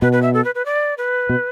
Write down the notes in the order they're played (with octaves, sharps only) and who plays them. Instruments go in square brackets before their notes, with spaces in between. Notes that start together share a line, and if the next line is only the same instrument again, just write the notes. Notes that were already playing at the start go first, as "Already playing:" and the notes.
[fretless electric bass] B2 [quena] B4
[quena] B4
E5
A4
B4
B4
D5
B4
[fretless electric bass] B2